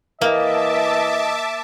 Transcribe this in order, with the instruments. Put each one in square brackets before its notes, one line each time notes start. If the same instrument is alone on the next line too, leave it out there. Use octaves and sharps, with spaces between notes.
[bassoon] E3 [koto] A#3 [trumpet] D#5 [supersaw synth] E5 A5 D6